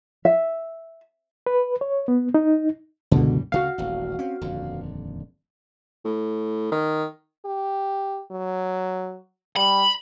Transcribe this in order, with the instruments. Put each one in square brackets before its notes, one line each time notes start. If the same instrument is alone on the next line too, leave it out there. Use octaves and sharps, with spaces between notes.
[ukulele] E5
[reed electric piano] B4
C#5
B3
D#4
[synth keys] C#2 B2 D3 [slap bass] F#2 E3 G3
[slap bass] D2 C#3 A3 [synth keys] F#4 F5
[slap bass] D#1 A1
C4 C#4
D#1 F2 D3
[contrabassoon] A2
D#3
[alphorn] G4
F#3
[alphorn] G3 [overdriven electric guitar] B5